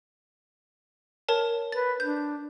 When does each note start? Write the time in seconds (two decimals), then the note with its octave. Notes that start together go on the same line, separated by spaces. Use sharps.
1.29 A#4 C#5 A5
1.72 B4 A6
2.00 D4 G6